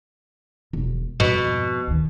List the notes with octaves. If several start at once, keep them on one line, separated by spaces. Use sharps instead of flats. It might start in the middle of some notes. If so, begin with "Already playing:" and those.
E1
F2 G#2 B2
D2 D#3